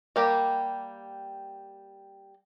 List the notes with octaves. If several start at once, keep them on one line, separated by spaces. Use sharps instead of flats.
G3 A#3 G4